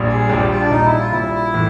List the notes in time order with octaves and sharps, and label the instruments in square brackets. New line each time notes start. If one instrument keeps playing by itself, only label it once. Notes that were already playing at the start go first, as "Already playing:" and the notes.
Already playing: [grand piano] A#1 A#2 G3
[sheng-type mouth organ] G#4
[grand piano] A#1 A#2 G3 [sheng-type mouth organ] G4
[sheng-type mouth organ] G4
F4
D4
[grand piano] A#1 A#2 G3 [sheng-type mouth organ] D#4
[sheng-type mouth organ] E4
F4
[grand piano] A#1 A#2 G3 [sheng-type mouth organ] E4
[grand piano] A2 E3